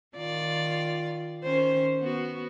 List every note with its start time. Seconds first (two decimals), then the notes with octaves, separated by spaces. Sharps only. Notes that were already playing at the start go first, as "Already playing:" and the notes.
0.17 D#3 F4 D5
1.44 D#3 C#4 C5
2.01 B3 F#4